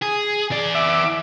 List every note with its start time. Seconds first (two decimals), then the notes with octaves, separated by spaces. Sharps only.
0.02 G#4
0.51 E3 D5
0.75 E5 D6